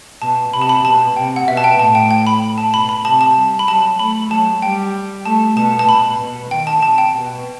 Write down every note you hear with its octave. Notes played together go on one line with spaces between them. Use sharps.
B2 A5
C3 B5
A5
B5
B2 A5
C3 G5
F#5
B2 E5
A5
G5
A2 A5
G5
G5
B5
A5
B2 B5
B5
C3 A5
A5
G3
B5
F#3 A5
A3 B5
F#3 A5
G3 G5
A3 A5
B2 A5
A5
B2 B5
B2
D#3 G5
A5
C3 A5
G5
B2